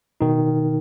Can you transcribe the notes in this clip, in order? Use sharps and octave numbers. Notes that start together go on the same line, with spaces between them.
B2 D#3 D#4